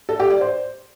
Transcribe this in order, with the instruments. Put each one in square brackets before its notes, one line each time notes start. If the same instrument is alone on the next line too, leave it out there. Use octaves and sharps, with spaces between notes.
[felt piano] A4
G4
D5
C5